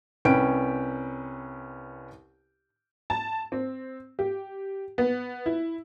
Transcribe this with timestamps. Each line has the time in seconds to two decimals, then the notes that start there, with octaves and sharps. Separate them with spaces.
0.25 C2 C#4 B4 G5 D7
3.10 A5
3.52 C4
4.19 G4
4.98 B3
5.46 E4